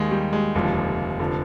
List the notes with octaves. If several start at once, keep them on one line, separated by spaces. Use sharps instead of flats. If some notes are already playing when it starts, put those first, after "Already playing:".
Already playing: D#2 D#3 G#3
G3
G#3
F1 D#2 D3 F3
F1 D3 F3